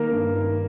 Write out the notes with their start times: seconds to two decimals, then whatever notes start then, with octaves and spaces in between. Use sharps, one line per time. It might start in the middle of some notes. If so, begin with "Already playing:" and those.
Already playing: D#3 A#3 A#4
0.12 G2
0.35 D#3